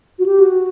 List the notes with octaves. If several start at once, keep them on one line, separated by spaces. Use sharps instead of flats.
F#4
G4
F#4